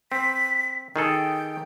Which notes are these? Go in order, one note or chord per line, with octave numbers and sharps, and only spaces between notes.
C4 B6
D#3 G#4 A4 G5